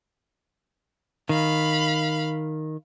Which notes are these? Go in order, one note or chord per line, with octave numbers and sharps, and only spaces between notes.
D#3 F5 B5